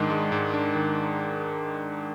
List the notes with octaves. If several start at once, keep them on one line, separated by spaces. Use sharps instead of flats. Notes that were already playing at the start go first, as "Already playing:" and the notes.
Already playing: G#2 D#3 G#3 D4
G#3
G#2
D4
D#3